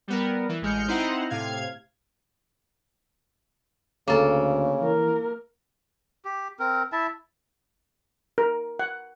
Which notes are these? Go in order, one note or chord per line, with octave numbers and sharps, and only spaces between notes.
G3 B3 A#4
E3
A1 G#3 F6 G6 C#7
C4 D#4 E4 C5 F#5 A#5
A2 C3 F5 G#6
D2 C#3 A#3 A4
E3 A#4
G4
C4 A#4
E4 E5 A5
A#4
F#5